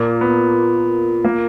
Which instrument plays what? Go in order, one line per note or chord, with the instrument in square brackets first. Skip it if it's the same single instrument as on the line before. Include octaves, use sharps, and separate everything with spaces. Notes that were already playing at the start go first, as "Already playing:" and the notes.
Already playing: [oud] A#2 [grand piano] A#3
[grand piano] B3
A#3